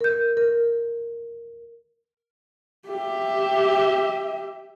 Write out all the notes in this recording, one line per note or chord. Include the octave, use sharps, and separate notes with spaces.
A#4 G6
A#4
G4 E5